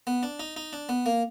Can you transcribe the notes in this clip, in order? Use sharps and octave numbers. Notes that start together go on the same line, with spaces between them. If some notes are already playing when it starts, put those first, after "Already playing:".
B3
D4
D#4
D#4
D4
B3
A#3